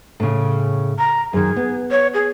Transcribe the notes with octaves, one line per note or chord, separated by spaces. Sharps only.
A2 C#3
A#5
F#2 D#3 G#4
B3
C#5
G#4